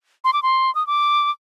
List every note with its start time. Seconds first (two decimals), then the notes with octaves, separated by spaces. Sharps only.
0.24 C6
0.33 D6
0.43 C6
0.75 D#6
0.87 D6